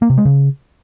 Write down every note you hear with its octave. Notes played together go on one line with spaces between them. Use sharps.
A#3
C3
G#3
C#3